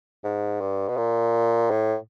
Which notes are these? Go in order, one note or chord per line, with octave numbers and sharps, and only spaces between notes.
G#2
G2
B2
A#2
A2